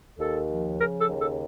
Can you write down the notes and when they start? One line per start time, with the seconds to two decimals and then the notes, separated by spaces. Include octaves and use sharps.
0.18 D#2 A4
0.48 F3
0.78 C#3 A#4
0.99 A4
1.09 D#2
1.19 A4